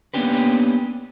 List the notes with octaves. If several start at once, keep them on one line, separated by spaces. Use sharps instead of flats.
A#3 B3 C#4 D4 G4 B4